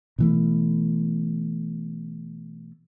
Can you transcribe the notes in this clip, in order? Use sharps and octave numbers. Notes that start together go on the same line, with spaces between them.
B2 E3 A3